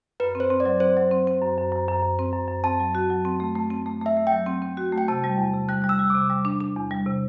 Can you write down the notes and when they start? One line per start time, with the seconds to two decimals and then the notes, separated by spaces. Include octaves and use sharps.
0.20 F#2 B4
0.35 C4
0.40 C5
0.50 C4
0.60 D5
0.65 F#3
0.80 C4 C5
0.97 F#3
1.11 C4
1.27 C4
1.42 F#2
1.58 F#2
1.72 F#2
1.88 F#2
2.03 F#2
2.19 C4
2.33 F#2
2.48 F#2
2.64 C4 A5
2.80 F#3
2.95 F#4
3.10 F#3
3.25 C4
3.40 A3
3.55 A3
3.70 C4
3.86 A3
4.01 A3 E5
4.17 A3
4.27 G5
4.32 F#3
4.46 C4
4.62 C4
4.77 F#4
4.92 A3
4.98 G5
5.08 C3 A5
5.24 G3
5.38 E2
5.53 C3
5.69 G3 F#6
5.82 G3 F#6
5.89 E6
5.99 G3
6.10 C3 D6
6.30 G3
6.45 D4
6.61 D4
6.76 E2
6.91 G3
7.06 C3